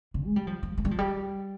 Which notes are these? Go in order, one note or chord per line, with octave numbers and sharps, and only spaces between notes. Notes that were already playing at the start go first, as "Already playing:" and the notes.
C#3
G#3
G3
F3
F3
G#3
G3
F3
G3